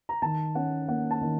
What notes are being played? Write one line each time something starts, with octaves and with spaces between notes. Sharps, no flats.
A#5
D#3 A5
C#4 F#5
A#3 F#5
A5
D#3